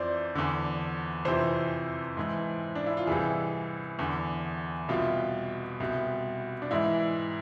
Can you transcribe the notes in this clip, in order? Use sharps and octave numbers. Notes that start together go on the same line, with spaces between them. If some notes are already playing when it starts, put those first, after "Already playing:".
Already playing: F2 E3 C5 D5
E2 D3
F2 C3 E3 C5
G#2 E3
D4
E4
F4
C2 C3 E3 G#4
E2 D3
C2 B2 F4
C2 B2
D4
G#2 E3 E4